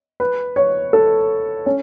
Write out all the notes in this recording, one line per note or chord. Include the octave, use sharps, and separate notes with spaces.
B4
C#5
A4
C#4